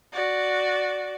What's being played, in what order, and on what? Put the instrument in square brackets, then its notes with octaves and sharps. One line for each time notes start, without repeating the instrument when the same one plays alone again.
[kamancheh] F#4 D5